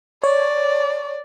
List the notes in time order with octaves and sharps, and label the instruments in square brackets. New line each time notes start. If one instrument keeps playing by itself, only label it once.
[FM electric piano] C#5 [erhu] D5